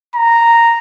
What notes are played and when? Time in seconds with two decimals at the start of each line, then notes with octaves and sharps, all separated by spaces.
0.15 A#5